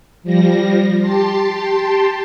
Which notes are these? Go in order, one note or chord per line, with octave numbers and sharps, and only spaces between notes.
F3 G3 A#6
G4 A5 C6